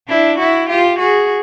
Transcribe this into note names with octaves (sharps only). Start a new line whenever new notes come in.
D4 E4
E4 F#4
F4 G4
F#4 G#4